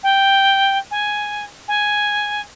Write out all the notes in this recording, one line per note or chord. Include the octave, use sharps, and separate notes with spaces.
G5
G#5
G#5